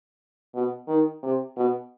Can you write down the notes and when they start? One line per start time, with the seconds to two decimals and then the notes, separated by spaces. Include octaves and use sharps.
0.54 B2
0.88 D#3
1.23 C3
1.56 B2